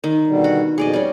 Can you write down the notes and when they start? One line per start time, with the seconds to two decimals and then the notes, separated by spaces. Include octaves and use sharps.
0.04 D#3
0.27 B2 D3 G3
0.44 F#4
0.78 F2 B2 G#4 D5 D#5
0.93 G3 C#4